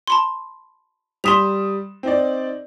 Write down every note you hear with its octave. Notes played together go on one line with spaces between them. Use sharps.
A5 B5 C6
G3 C6 D#6 B6 E7 F7
C4 D#4 D5